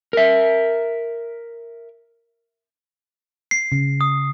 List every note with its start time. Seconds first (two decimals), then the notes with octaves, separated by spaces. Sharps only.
0.13 A#4 E5
3.51 C7
3.72 C#3
4.01 D#6